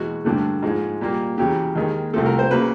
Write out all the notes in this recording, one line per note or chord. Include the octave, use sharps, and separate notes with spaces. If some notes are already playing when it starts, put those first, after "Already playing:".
Already playing: E2 B2 G#3 F#4
G2 D3 F#3 A3
G#2 F3 G#3
A#2 G3 A#3
E2 C#3 F#3 G4
D#2 D#3 G#3
C2 C3 F3 A3 A4
A#4
C5
C#3 F#3 A#3 B4